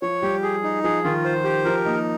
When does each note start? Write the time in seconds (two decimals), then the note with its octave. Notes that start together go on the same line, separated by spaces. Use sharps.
0.02 F3 C#5
0.22 G3 G4
0.43 G#4
0.63 D#4
0.84 F3 G#4
1.04 D#3 F4
1.24 C5
1.44 G4
1.65 F3 A#4
1.85 A#3 D#4